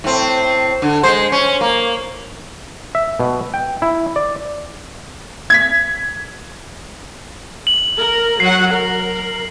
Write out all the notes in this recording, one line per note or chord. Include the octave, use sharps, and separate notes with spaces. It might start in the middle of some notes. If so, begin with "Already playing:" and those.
A2 C4
D3
G#3 C5
C#4
A#3
E5
B2
G5
E4
D5
G#6 B6
F#7
A#4
F#3 F#5 C7
A#4